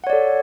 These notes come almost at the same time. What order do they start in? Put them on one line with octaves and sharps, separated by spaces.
F#5 C#5 D5 A4